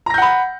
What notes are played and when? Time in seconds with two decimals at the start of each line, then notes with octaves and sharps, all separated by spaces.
0.06 A#5
0.10 A#6
0.14 G6
0.18 F#5
0.22 B5